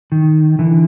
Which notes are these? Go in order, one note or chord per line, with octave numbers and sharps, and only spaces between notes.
D#3
D3 E3